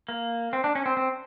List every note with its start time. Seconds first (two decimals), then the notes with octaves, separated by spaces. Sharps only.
0.09 A#3
0.53 C4
0.64 D4
0.75 C#4
0.86 C4
0.97 C4